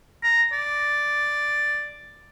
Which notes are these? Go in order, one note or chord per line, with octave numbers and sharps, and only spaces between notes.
A#5
D5